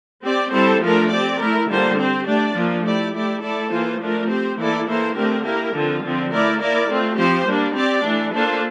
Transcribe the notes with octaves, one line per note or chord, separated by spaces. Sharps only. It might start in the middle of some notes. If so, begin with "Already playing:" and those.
C4 G4 D5
G3 C4 E4 A4 C5
F3 A3 D4 F4 A#4
C4 G4 D5
A3 E4 A#4
D3 G3 A#3 F4 C5
C4 G4 C5
A3 D4 G4 D5
F3 A#3 D4 F4
A3 E4 G4 D5
A3 E4 G4 D5
A3 E4 A4 D5
E3 A#3 F4 C5
F3 A3 D4 F4 A#4
C4 G4 C5
E3 A#3 E4 A4 D5
E3 A#3 E4 A4 C5
D3 A3 C4 G4 A#4
A#3 E4 G4 A#4
D3 F3 C4 F4
D3 F3 C4
A3 E4 A#4 D5
A#3 E4 A#4 D5
A3 C4 F4
F3 C4 G4 C5
G3 A#3 D4
C4 G4 D5
E3 A3 D4
A#3 D4 F4 A4 C5